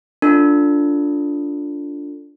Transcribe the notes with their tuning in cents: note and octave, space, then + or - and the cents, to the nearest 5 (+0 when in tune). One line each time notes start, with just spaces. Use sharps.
D4 -15 F4 +0 A4 +15